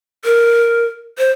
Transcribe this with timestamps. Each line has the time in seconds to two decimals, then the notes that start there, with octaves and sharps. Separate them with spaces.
0.25 A#4
1.18 C5